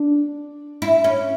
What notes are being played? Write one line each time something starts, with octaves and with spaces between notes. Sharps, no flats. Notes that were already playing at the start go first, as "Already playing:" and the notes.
Already playing: D4
E4
C#4